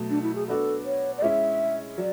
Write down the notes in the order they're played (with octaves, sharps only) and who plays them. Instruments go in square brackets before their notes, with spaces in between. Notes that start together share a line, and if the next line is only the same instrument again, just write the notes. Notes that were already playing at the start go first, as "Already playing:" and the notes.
Already playing: [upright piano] B2 F#3 A3
[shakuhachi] D4
E4
G#4
[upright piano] B3 D4 F#4 [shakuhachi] A4
[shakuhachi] C#5
D5
[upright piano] G#3 C#4 E4 [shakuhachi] E5
[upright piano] F#3 [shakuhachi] D5